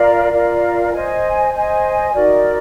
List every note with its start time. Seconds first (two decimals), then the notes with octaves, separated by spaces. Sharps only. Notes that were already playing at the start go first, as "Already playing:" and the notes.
Already playing: F4 A#4 D5 F5
0.32 F4 A#4 D5 F5
0.93 C5 D#5 G#5
1.52 C5 D#5 G#5
2.13 D#4 F#4 A#4 D5